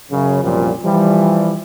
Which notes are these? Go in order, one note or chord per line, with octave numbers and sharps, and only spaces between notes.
F#2 C#3
C2 F#2 A#2 F3 G3
E3 F3 G3